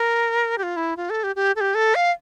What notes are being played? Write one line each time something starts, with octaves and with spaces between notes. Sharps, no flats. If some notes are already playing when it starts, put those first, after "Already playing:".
Already playing: A#4
G4
F4
E4
F4
A4
G4
G4
A4
G4
A4
F5